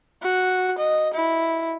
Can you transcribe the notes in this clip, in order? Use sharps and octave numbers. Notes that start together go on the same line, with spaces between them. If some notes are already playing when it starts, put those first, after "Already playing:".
F#4
D#5
E4